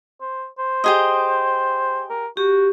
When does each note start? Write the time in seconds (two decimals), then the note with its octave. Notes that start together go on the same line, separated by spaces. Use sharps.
0.21 C5
0.58 C5
0.84 G4 G#4 D#5
2.10 A#4
2.37 F#4 G4